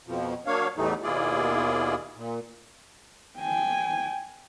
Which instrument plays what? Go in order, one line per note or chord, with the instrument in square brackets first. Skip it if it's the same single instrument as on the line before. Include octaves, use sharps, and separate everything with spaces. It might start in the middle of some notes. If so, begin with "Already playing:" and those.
[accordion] F2 B2 F3
F#3 A#3 D4 C#5 F5
E2 A2 E3 G3 A3 D#4
D#2 B2 E4 F4 G#4 D5
A#2
[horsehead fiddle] G5 G#5